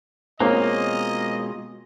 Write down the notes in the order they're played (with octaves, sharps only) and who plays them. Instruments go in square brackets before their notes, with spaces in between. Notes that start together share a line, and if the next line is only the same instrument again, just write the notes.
[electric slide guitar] B2 G#3 F4 [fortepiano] A#3 A#5 [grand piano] C4 C#4 [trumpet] D#5